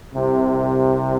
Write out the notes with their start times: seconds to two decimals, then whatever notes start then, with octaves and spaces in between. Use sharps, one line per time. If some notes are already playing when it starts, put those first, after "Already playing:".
0.14 C2 C3